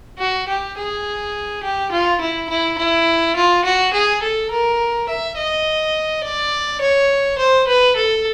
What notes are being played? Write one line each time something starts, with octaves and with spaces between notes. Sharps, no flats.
F#4
G4
G#4
G4
F4
E4
E4
E4
F4
F#4
G#4
A4
A#4
E5
D#5
D5
C#5
C5
B4
A4